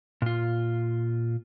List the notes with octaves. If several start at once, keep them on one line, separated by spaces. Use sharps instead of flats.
A#2 F4